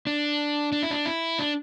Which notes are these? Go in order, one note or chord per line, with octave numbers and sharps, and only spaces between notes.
D4
D4
E4
D4
E4
D4